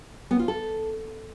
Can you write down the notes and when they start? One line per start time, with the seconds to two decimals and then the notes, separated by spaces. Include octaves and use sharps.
0.31 B3
0.39 F4
0.48 A4